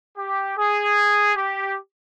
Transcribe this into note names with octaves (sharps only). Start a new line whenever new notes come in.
G4
G#4
G4